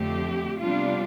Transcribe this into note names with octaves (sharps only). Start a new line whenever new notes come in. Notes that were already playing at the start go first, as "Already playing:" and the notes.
Already playing: F2 D3 A3 C4 G4
C3 G3 B3 D4 F4